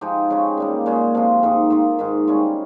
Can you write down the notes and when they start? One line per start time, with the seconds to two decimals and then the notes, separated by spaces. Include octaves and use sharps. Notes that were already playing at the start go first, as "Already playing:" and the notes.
0.01 F3 G#3 D#4 G4
0.30 C#3 G#3 C#4 G4
0.58 A#2 G3 A#3
0.86 A#2 G#3 C#4 G#4
1.14 C3 F3 C4 F4
1.43 G#2 D#3 A#3
1.70 D#3 A#3 F4
1.99 G#2 D#3 G#3
2.27 C3 G3 C#4